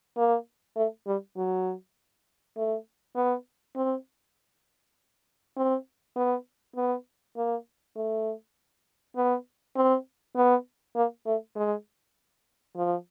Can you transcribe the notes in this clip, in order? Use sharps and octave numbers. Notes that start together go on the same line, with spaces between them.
A#3
A3
G3
F#3
A3
B3
C4
C4
B3
B3
A#3
A3
B3
C4
B3
A#3
A3
G#3
F3